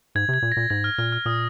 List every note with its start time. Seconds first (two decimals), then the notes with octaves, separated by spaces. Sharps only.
0.15 G#2 G#6
0.29 C3
0.34 G#6
0.42 A#2
0.52 A#6
0.57 A#2
0.70 G#2 G#6
0.84 F6
0.98 A#2 F6
1.12 F6
1.25 A#2 D#6